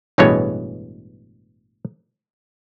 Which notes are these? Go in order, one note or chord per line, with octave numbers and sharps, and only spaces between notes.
A1 G2 B2 E3 G#3 C#5